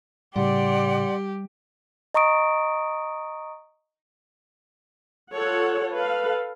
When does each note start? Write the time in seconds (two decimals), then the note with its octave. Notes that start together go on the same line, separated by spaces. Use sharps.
0.36 A2 C#3 G3 G4 D5 F#5 C6
2.14 D#5 A#5 C#6 D#6 D7
5.33 F4 A4 C#5 F#5
5.94 A4 B4 F5